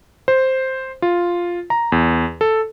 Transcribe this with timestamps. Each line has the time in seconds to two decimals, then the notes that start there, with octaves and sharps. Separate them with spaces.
0.28 C5
1.02 F4
1.70 A#5
1.92 E2
2.41 A4